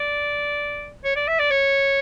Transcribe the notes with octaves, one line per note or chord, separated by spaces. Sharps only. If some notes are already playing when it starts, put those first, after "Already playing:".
Already playing: D5
C#5
D5
E5
D5
C#5